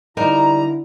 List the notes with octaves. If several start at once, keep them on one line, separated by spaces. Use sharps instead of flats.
D3 G3 D#4 E4 A#4 A#5